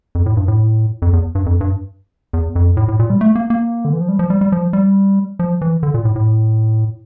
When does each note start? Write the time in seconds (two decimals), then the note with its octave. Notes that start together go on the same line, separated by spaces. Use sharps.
0.15 F2
0.26 A2
0.37 G2
0.48 A2
1.02 F2
1.13 E2
1.35 G2
1.46 F2
1.61 G2
2.33 E2
2.56 F2
2.77 A2
2.88 A2
2.99 A#2
3.10 G3
3.21 A3
3.35 A#3
3.50 A#3
3.85 D3
3.93 E3
4.01 F3
4.09 G3
4.19 F3
4.30 G3
4.41 G3
4.52 F3
4.73 G3
5.39 F3
5.61 E3
5.83 D3
5.94 A#2
6.05 A2
6.16 A2